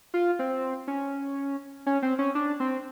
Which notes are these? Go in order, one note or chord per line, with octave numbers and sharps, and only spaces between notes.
F4
C4
C#4
C#4
C4
C#4
D4
C4